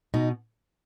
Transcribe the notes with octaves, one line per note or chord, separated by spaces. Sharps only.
B2 D#4